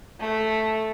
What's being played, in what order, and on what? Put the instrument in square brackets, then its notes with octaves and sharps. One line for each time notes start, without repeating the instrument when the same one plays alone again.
[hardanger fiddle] A3